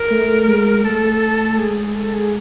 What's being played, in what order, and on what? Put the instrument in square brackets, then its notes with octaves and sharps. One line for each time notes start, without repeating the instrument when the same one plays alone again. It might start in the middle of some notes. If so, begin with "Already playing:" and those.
Already playing: [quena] A#4
[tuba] A3
G#3
[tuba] A3 [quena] A4
[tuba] G#3 [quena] G#4
[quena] A4
G#4